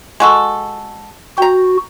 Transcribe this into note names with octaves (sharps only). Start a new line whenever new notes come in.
G#3 F#4 A4
F#4 G5 A#5